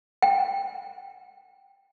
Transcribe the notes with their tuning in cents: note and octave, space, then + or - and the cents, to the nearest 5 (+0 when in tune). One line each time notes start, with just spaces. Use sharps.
G5 +10